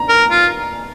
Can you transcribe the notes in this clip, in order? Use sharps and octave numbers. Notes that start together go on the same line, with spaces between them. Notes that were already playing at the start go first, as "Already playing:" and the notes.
Already playing: A#5
A#4
F4